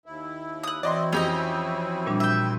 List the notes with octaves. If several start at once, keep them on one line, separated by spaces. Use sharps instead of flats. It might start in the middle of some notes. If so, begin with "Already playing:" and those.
D#2 E4
D#6 F#6
E3 C4 E4 F#4 D5 D#5 C6
F2 C#4 G4 D#5
A#2 G3 D4
E5 G5